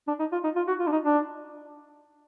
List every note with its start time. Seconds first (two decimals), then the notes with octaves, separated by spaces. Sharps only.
0.08 D4
0.19 D#4
0.32 F4
0.44 D#4
0.56 F4
0.68 F#4
0.79 F4
0.87 D4
0.92 D#4
1.04 D4